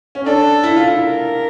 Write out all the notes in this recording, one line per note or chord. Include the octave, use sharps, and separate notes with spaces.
C#4
D4 A4
E4
F4
E4
A#4